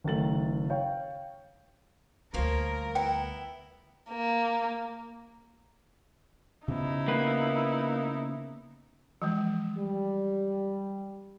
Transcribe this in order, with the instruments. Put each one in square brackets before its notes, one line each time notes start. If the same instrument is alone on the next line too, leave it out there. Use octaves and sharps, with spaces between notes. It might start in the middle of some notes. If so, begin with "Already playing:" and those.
[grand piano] F#1 D#3 A3 A6 F#7
C#5 F5 G5
[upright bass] D2 G3 [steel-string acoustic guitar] F3 A#3 C#5 [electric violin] A#4
[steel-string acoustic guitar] B3 E4 [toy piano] G5
[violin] A#3
[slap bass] C#3 B3 [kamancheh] D#4 E4
[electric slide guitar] A#3 B4
[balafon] E3 F3 G#3
[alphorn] G3